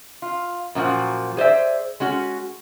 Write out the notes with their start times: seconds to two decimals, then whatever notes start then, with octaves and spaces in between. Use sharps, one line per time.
0.22 F4
0.75 F#2 A#2 F3 F#4
1.37 G#4 C5 D5 E5
2.00 G#3 C#4 F#4